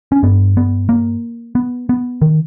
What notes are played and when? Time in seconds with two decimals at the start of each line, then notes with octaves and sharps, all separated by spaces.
0.12 C#4
0.23 G2 B3
0.57 B3
0.89 A#3
1.55 B3
1.89 B3
2.22 D#3